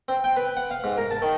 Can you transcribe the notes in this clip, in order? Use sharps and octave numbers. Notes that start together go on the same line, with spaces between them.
C4
G5
B4
F#5
F5
G#2
A#4
A5
D#3